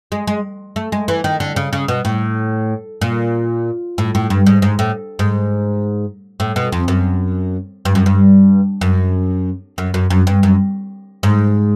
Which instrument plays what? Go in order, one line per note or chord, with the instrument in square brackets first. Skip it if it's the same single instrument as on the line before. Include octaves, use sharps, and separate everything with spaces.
[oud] G#3
G#3
A3
G#3
E3
D#3
D3
C#3
C#3
B2
A2
A#2
A2
A2
G2
G#2
G#2
A2
G#2
A2
B2
F2
F#2
G2
F#2
G2
F#2
F#2
F#2
F#2
G2
F#2
G#2